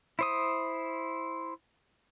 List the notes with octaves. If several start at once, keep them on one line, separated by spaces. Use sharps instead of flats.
E4 C5 D#6